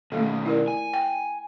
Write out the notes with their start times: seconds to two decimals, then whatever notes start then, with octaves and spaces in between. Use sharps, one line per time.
0.12 B2 D#3 A3 A#3 A4
0.46 E4 A#4 D5
0.68 G#5
0.94 G5